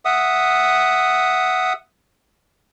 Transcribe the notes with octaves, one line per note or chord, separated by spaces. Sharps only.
E5 F#5 D#6